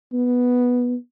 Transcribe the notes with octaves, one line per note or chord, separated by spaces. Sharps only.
B3